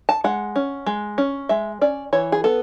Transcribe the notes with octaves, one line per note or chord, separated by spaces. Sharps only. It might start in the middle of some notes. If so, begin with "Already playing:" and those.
A5
G#3 F#5
C#4
G#3
C#4
G#3 E5
C#4 D5
E3 C#5
G#4
B3 A4